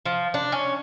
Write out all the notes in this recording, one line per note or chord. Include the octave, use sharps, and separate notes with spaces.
F3
D4
C#4